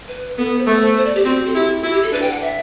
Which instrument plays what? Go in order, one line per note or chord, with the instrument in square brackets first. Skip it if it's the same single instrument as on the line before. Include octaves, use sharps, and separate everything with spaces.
[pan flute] B4
[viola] B3 [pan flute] A4
[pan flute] C5
[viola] A3 [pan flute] B4
[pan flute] C5
C5
D5
G4
[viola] C4 [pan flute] F#4
[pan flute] A4
[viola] E4 [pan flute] G4
[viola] E4 [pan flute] F#4
[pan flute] G4
A4
[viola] D4 [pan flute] B4
[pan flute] G5
F#5
E5